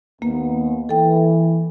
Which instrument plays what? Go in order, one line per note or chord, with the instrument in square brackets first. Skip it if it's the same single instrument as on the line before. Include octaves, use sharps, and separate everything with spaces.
[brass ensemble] D#2 B3 [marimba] A#3
[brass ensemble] E3 [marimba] A4 G5